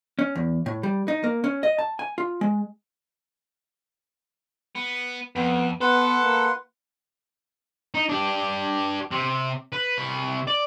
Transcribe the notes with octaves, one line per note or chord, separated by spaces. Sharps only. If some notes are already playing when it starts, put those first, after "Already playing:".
C#4
E2
A2
G3
D#4
A#3
C#4
D#5
A5
G#5
F4
G#3
B3
F2 B3
B3 A4 B4 F#5 C6
A#3
D#4
D4 G4
C3
B4
C3 B5
D5